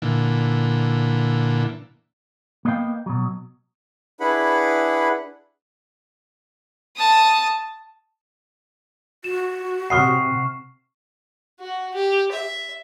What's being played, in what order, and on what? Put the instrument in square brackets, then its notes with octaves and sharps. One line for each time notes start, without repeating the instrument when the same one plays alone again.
[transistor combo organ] A#2 D3 E3
[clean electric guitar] A#3 B3 D#5 F5 G5
B2 F#3
[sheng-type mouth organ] D4 E4 G#4 B4 F#5 B5
[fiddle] A5 D#6
[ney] F#4 [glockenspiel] E7
[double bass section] C3 [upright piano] F#5 D#6 F6 [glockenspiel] C#6 C7
[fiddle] F#4
G4
E5